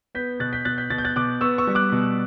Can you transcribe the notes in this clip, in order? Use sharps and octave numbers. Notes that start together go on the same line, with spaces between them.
B3 G6 B6
B2 F#6 A6
G6 B6
B2 F#6 A6
G6 B6
B2 A6
G6
F#6 A6
B2 D6 F#6
B3 C#6 E6
C#6 E6
G3
D6 F#6
B2